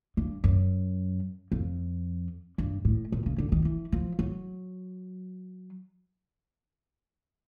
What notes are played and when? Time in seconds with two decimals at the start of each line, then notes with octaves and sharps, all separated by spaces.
0.17 G2
0.44 F#2
1.52 F2
2.58 G2
2.85 A2
3.12 A#2
3.26 C#3
3.38 D3
3.52 D#3
3.65 E3
3.92 F3
4.19 F#3